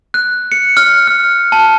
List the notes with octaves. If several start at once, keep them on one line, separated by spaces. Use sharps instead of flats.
F#6
C#7
F6
F6
A5